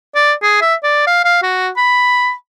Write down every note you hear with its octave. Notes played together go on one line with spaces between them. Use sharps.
D5
G#4
E5
D5
F5
F5
F#4
B5